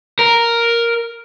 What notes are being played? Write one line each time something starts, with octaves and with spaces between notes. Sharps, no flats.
A#4